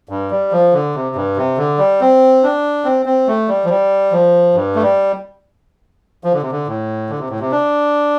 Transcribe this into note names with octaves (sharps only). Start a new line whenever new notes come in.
G2
G3
F3
D3
C3
G2
C3
D3
G3
C4
D4
C4
C4
A3
G3
F3
G3
F3
G2
A3
G3
F3
D3
C3
D3
A2
D3
C3
A2
C3
D4